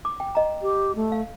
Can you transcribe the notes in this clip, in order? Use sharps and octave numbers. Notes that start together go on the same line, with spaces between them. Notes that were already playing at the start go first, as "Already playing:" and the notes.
D6
G5
D#5 A#5
G4
A3
F5